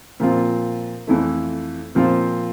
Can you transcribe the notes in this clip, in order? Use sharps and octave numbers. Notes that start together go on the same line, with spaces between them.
A#2 F3 C4 F4
F2 E3 A3
A#2 F3 C4 F4